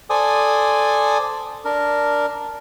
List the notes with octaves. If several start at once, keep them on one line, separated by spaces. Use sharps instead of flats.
A4 C5 D5 G#5 D#6
D4 A#4